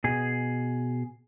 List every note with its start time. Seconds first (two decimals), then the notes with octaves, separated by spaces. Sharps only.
0.04 B2 G#4